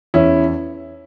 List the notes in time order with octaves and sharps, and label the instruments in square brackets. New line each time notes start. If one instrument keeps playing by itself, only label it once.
[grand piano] E2 C#4 E4